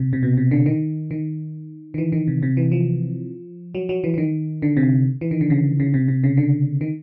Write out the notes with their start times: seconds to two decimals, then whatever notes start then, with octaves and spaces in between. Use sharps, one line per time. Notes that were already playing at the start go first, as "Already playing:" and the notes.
Already playing: C3
0.13 C3
0.23 B2
0.37 C3
0.51 D3
0.66 D#3
1.11 D#3
1.94 D#3
1.98 E3
2.12 D#3
2.27 C3
2.43 C3
2.57 E3
2.72 F3
3.75 F#3
3.89 F#3
4.04 E3
4.14 E3
4.18 D#3
4.62 D3
4.77 C3
5.21 E3
5.31 D#3
5.41 D3
5.50 C#3
5.80 C#3
5.94 C3
6.08 C3
6.24 C#3
6.37 D3
6.81 D#3